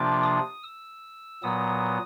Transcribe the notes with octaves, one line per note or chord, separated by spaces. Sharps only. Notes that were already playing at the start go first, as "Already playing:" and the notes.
Already playing: C3 F3 A#3 D4 F4 D6
D#6
E6
A#2 F#3 B3 D#6